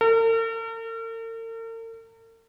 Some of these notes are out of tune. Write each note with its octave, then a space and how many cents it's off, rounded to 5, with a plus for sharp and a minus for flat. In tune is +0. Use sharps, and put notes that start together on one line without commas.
A#4 -45